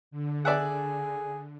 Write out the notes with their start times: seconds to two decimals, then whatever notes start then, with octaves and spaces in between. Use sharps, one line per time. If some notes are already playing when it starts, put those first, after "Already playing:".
0.11 D3
0.45 G#4 D5 E5 F#5